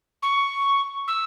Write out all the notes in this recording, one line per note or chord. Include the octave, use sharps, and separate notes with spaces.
C#6
E6